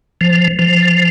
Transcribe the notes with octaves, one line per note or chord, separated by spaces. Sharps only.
F3
F3